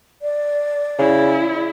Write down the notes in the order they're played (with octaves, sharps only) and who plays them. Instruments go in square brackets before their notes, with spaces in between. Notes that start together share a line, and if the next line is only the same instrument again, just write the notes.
[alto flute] D5
[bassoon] C#3 [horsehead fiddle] E4